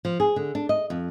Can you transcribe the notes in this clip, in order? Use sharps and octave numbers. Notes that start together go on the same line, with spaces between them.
F3
G#4
D3
D4
D#5
F2